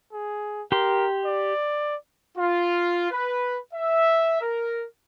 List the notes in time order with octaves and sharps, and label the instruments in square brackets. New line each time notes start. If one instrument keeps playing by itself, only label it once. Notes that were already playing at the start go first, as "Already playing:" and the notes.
[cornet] G#4
[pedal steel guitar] G4 C6 [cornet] A#4
[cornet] D5
[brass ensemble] F4
B4
E5
A#4